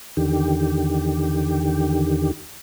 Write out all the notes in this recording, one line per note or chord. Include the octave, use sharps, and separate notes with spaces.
E2 D3 D#3 G4